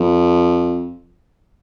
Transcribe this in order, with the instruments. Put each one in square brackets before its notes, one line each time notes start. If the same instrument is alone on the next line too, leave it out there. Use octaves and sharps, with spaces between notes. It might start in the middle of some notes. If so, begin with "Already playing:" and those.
Already playing: [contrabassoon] F2